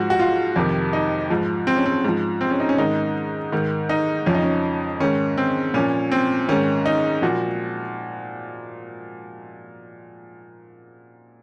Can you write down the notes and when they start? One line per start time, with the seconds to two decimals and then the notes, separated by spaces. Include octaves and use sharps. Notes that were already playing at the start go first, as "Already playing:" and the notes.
Already playing: G#2 F3 F#4
0.10 F#4
0.20 F4
0.56 F2 C3 D#3
0.93 D#4
1.30 G#2 F3
1.67 C4
1.76 C#4
1.86 C4
2.04 G#2 F3
2.41 C4
2.51 C#4
2.60 D#4
2.69 C#4
2.78 G#2 D#3 D#4
3.52 G#2 D#3
3.89 D#4
4.26 F2 C#3 F3 C#4
4.35 D#4
4.42 C#4
5.00 G#2 D#3 C#4
5.38 C4
5.74 A#2 F3 C#4
6.12 C4
6.48 G#2 D#3 C#4
6.86 D#4
7.22 A#2 F3 F#4